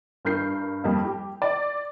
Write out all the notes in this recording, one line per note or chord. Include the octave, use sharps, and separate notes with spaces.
G2 A#4 G6 C7
F2 G3 A#3
G4
D5